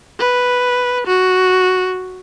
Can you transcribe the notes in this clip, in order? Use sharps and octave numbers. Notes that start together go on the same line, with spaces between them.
B4
F#4